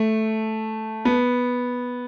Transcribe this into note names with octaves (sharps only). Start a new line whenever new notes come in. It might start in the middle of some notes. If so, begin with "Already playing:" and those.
Already playing: A3
B3